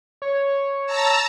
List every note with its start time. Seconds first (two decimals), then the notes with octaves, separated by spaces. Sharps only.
0.22 C#5
0.86 A5 A#5 E6